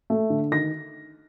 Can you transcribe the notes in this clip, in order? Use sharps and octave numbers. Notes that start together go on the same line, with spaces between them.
A3
D3
D#3 A#6